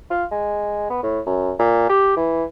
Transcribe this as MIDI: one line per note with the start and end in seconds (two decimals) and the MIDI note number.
0.11 0.25 65
0.32 0.88 56
0.90 1.01 59
1.03 1.20 45
1.27 1.53 42
1.59 1.85 46
1.89 2.14 67
2.17 2.44 52